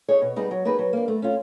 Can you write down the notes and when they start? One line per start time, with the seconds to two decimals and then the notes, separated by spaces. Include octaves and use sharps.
0.08 D#4 G#4 C#5
0.22 B2
0.36 G3 B3 D#4 G#4
0.51 F#3
0.65 A#3 D#4 G#4 B4
0.79 F#3
0.93 A#3 D4
1.08 A3
1.22 C#4 F4